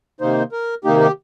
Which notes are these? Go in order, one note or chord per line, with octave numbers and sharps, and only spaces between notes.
C3 D#3 A#3 D#4 C5
A#4
C3 D#3 A#3 D#4 G4
G4